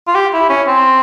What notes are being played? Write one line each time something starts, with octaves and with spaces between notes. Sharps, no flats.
F4
G4
E4
C#4
C4